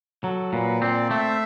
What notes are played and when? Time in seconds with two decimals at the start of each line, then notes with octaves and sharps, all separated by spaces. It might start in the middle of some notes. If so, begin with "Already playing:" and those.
0.24 F#3 A4
0.53 A#2 B4
0.81 C4 D5
1.10 A3 E5